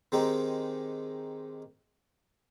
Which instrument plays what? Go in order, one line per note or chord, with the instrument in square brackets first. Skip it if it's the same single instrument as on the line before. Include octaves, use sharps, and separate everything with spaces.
[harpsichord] D#3 G#3 C4 D#4 G4